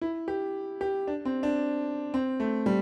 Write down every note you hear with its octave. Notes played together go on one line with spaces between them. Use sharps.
E4
G4
G4
D4
C4
D4
C4
A3
G3